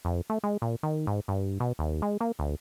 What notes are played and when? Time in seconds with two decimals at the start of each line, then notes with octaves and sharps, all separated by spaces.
0.05 F2
0.30 A3
0.43 G#3
0.62 A#2
0.83 D#3
1.07 G#2
1.28 G2
1.60 B2
1.79 D#2
2.02 G#3
2.21 A#3
2.39 D2